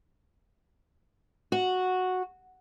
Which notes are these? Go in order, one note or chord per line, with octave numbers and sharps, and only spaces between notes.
F#4